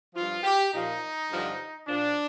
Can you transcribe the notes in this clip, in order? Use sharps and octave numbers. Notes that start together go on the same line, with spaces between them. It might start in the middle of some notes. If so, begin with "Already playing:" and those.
G2 F3 F4
G4
A#2 F3 D#4
G2 D3 F3
A#2 F3 D4